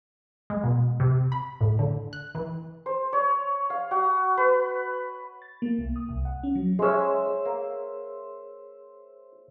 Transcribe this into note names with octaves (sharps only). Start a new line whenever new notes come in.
G#3
B2
C3
B5
A2
D3
F#6
E3
C5
C#5
F5
F#4
B4
A6
A#3
C2
D#6
C2
F#5
C#4
F#3
G#3 C#4 G#4 C5 C#5 E5
A#3